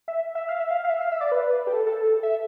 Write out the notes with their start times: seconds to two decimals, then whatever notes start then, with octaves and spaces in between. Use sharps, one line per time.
0.08 E5
0.35 E5
0.49 F5
0.60 E5
0.71 F5
0.84 F5
0.90 E5
1.01 F5
1.12 E5
1.21 D5
1.32 B4
1.67 G4
1.73 A4
1.87 A4
2.00 A4
2.23 E5